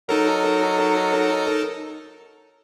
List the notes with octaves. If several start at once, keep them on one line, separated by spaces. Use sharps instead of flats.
F#3 D#4 A4 A#4